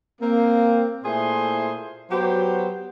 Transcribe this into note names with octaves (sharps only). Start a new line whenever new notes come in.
A#3 C4
A#2 A3 E4 G#4 C5 C6
F#3 B3 F#4 G4 C5